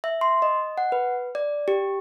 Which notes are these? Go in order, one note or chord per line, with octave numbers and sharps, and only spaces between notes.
E5
C6
D#5
F#5
B4
D5
G4